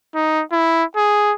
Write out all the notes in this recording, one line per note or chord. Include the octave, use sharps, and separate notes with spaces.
D#4
E4
G#4